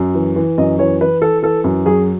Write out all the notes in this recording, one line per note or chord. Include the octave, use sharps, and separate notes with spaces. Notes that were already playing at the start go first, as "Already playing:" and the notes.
Already playing: F#2
E3
E3
F#2 D#5
E3 C#5
E3 B4
E3 A4
E3 A4
F#2
F#3 G#4